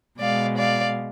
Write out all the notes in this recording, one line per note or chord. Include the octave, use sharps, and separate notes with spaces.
B2 G#3 D5 F5
D5 F5